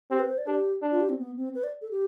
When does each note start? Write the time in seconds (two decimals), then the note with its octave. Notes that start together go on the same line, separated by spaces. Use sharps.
0.11 C4 G4
0.19 B4
0.29 C5
0.38 D5
0.47 D4 G4
0.82 D4
0.91 F4
1.00 G4
1.09 C4
1.19 B3
1.36 C4
1.55 B4
1.64 D5
1.81 A4
1.91 G4